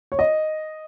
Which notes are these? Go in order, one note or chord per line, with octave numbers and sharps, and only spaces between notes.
C#5
D#5